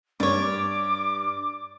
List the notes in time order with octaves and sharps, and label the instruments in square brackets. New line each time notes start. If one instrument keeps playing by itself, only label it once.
[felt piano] G2 [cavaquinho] C#5 D5 [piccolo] D6